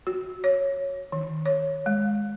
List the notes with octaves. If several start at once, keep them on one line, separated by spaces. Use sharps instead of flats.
F#4
C#5
D#3
C#5
G#3